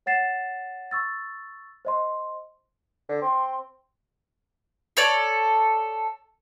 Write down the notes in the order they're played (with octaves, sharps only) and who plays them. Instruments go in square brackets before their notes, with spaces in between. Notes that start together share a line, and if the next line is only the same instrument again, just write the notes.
[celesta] C#5 F#5 A6 C7 E7
C#6 E6 A6
C5 D#5 C6
[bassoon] D3
[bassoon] C4 [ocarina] C6
[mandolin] A4 C#5 D5